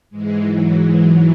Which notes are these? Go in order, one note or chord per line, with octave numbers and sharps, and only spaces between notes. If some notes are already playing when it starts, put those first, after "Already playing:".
G#2 E3 G#3
F#3
G#3
F#3